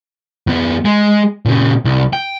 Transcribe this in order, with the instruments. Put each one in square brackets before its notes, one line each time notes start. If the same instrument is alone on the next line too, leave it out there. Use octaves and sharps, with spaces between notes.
[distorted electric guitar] F2 B3
G#3
A#2 C#3
C2
G5